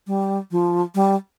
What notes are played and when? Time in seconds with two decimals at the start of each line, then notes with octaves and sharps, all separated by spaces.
0.07 G3
0.51 F3
0.95 G3